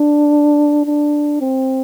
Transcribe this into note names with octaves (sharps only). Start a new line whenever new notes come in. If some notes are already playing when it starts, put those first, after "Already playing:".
Already playing: D4
D4
C4